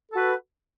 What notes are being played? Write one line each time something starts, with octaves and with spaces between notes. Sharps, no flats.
F#4 A4 B4